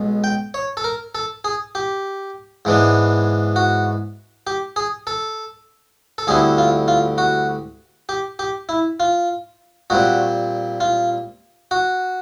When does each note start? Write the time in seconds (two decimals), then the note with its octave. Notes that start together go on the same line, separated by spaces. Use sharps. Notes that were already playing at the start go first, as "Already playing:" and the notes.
Already playing: B1 B2 G#3
0.24 G5
0.54 C#5
0.77 A4
0.84 A#4
1.15 A4
1.44 G#4
1.75 G4
2.65 G#2 E3 G#3 B3 D4
3.56 F#4
4.47 G4
4.76 G#4
5.07 A4
6.18 A4
6.27 D2 D3 G3 C4 E4 G#4
6.58 F4
6.88 F4
7.18 F#4
8.09 G4
8.39 G4
8.69 E4
9.00 F4
9.90 A#2 G3 C4 F#4
10.80 F4
11.71 F#4